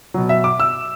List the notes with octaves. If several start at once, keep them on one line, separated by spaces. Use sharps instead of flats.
B2 F#3
E5
D6
E6